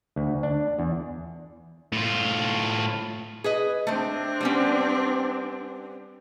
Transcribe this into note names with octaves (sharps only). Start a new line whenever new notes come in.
D2
D4
E2
A2 F4
G#4 B4 D#5
A3 C4 D4 C5
G3 B3 C#4